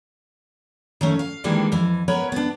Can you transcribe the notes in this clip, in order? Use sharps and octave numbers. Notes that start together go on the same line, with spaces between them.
D#3 A3 C#4
F5
D#3 E3 G3 G#3 A#3 D4
F2 E3
B3 A#4 B4 C#5
B3 D4